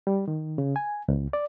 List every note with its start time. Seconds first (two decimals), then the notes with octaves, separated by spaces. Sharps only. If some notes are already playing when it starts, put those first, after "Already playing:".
0.07 G3
0.28 D#3
0.58 C#3
0.76 G#5
1.08 C#2
1.33 D5